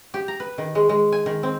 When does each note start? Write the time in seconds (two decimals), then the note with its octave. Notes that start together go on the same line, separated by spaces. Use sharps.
0.14 G4
0.28 A#5
0.40 B4
0.58 D#3
0.75 G#3
0.89 G#3
1.12 G#5
1.26 D#3
1.43 C4